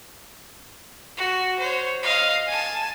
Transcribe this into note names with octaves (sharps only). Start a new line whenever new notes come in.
F#4
C5 C#5
D#5 F5
G#5 A5